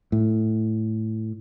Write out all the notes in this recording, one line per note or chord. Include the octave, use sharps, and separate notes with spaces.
A2